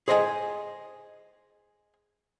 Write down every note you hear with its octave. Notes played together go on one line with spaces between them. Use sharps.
G#4 C5 D#5 F5 G#5